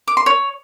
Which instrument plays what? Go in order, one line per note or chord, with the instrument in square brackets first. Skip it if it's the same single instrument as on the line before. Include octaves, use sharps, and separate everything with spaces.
[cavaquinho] D6
C6
C#5